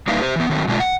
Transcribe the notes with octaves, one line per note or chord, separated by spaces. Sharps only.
G3 A#3 D#4 E4 B4 F5
G4 C5
E3 B3
D#3 F#3 A3 C4
B2 D3 G#3 A3 D4 F4
F#5